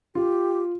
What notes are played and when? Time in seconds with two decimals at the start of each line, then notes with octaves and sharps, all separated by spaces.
0.15 F4 G4